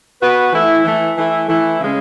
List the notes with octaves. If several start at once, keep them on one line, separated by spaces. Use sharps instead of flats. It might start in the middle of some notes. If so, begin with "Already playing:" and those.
B3 F#4 B4
E3 A3 E4
E3 A3 E4
E3 A3 E4
E3 A3 E4
C#3 G#3 C#4